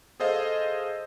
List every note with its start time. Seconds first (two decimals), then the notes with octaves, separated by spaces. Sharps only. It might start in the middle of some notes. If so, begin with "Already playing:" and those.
0.20 G#4 A4 C5 D#5 F5